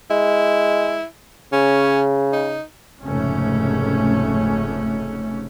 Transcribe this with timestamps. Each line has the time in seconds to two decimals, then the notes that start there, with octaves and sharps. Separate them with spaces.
0.11 G#3 E4
1.53 C#3 C#4
2.33 D#4
3.04 F1 G#2 C#3 A3 C#4